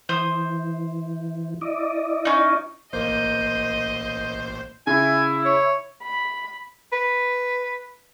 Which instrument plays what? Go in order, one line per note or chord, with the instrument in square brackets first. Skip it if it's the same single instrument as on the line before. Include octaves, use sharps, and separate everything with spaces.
[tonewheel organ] E3 [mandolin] C5 D#6
[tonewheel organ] E4 D5 D#5
[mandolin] C#4 D#4
[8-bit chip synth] A1 C5 [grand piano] A#3 [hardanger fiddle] D#5 [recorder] G6
[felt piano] C#3 [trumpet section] E4 [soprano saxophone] G#5
[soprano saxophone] C#5
[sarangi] B5
[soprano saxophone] B4